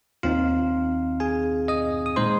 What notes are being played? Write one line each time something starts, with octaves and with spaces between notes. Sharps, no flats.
D#2 D#3 C4 D#4 F4 F5
G#4 G#5
D#5 D#6
D#6
A#2 G#3 D#4 C5 C6